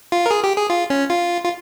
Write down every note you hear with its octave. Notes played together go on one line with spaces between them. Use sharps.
F4
A#4
G#4
G4
G#4
F4
C#4
F4
F4